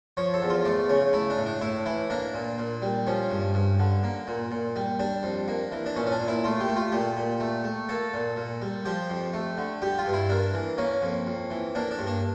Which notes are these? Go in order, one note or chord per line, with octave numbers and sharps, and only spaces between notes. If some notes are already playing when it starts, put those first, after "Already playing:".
F3 C#5
A4
E2
F4
A3 D5
C#3 C#5
A3 E4
D4
A2
D4
A2 E4
E3 E4
A#3 D4
A#2
A#2
G3
F3 C#4
G2
G2
D3
A#3
A#2
A#2
G3
G3 D4
F2
A#3
E3
D4
A#2 C#4
C#4
D4
A#2
E4
A3 F4
G4
A3
F4
A#2 G4
A#2
A3
A3
A#3 A4
A#2
A#2
G3
F3 G4
F2
A3
D3
G3 G4
F4
G2
E4
A#3 D4
E3
A#3 C#4
F2
F2
E3
A#3 D4
D4
G2
D4